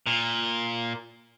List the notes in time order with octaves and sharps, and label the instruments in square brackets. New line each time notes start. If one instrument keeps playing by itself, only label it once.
[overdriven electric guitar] A#2